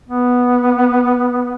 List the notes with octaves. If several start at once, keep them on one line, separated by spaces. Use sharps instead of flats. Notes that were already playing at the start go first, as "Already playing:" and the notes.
B3